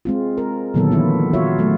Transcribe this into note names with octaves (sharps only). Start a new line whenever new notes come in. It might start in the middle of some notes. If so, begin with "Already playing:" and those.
G#3 C4 F4
A#4
A#2 D3 D#3 F#3 B3 A4
D#3 E3 B3 E4 F4
F4 F#4 C#5 E5
F#3 A3